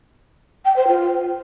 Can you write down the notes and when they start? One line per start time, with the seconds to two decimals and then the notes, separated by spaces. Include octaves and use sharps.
0.65 G5
0.76 C5
0.87 F4